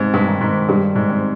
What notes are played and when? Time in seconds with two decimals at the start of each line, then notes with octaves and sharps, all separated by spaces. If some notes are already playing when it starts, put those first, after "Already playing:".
Already playing: G#2 C3
0.14 G2
0.27 D#3
0.41 G#2
0.68 G2 G3
0.96 G#2
1.09 C4